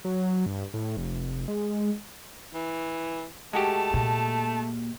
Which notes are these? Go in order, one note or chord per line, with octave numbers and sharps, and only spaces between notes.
F#3
G2
A2
F1
G#3
E3
G#3 A3 F#4 G4 A5
A#2